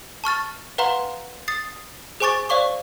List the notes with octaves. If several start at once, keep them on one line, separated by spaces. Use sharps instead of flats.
A5 C#6 F6 A6
B4 F5 F#5 A#5 C6
D#6 A6 C7
G#4 C5 G#5 C#6 D6 A6
C5 D5 F5 C#6 D6